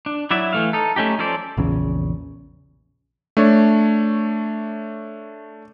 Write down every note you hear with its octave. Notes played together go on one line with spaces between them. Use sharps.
D4
F#3 E4 D5 E5
E3 A3 F5
D#4 A4
A3 C#4 D#4 G4
F3 C#4 A4 C5 D5
A#1 E2 C#3
A3 D4 C#5